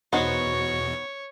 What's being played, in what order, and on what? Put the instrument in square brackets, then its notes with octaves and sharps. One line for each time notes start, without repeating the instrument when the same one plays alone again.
[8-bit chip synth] E2 B2 [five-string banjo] B3 D#4 C5 [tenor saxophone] F#4 [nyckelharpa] C#5